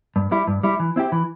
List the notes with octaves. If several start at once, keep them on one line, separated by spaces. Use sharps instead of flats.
G2
G3 E4
G2
G3 E4
E3
C4 E4 G4
E3